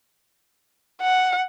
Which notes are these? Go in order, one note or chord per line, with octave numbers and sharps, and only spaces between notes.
F#5